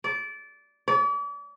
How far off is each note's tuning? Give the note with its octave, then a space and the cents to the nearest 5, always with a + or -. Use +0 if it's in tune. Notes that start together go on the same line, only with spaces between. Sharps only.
D5 -20
D5 -40